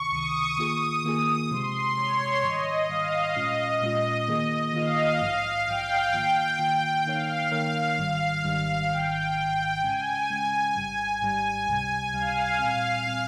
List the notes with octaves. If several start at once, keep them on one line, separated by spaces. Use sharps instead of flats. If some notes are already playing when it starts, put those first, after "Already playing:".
Already playing: C#2 C3 D#3 C#6
C#2 C3 D#3 D#6
D#3 A#3 F4 G#4
D#3 A#3 F4 G#4 D#6
C3 F3 G#3 C6
C3 F3 G#3 C#5
G#2 D#3 G3 D#5
G#2 D#3 G3 F5
A#2 G#3 C#4 F4 D#5
A#2 G#3 C#4 F4
D#3 A#3 F4 G#4
D#3 A#3 F4 G#4 F5
A#1 G#2 F3
A#1 G#2 F3 G5
D#3 A#3 F4
D#3 A#3 F4
D#3 A#3 D#4 A#4 C#5 F5
D#3 A#3 D#4 A#4 C#5
G#1 G#2 D#3 G3 F5
G#1 G#2 D#3 G3
G#1 G#2 D#3 G5
G#1 G#2 D#3
C#3 G#3 C#4 G#5
C#3 G#3 C#4
G#1 G#2 G3
G#1 G#2 G3 G#5
C#2 C3 G3
C#2 C3 G3 F5
A#2 G3 C4 F5
A#2 G3 C4